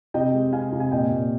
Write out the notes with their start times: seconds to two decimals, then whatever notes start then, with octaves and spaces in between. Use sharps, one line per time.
0.14 C3 D#5 G5
0.34 G#3
0.53 C3 F5 G#5
0.72 C3
0.80 G#5
0.92 A#2 D#5 G5
1.11 A#2